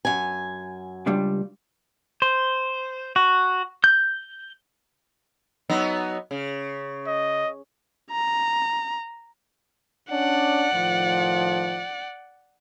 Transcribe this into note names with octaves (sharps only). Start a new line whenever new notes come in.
F#2 G#5
C#2 G3 D4
C5
F#4
G6
F#3 B3 D#4
C#3
D#5
A#5
C#4 D4 D5 F#5
A2 D#3 F3